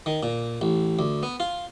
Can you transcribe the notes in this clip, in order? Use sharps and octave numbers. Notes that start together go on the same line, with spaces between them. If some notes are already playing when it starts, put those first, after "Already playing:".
D#3
A#2
A1
D2
B3
F4